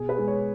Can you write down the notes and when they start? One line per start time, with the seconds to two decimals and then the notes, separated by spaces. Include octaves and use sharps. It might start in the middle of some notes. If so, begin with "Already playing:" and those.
Already playing: B2 G#4
0.09 B4
0.18 G#3
0.28 C#5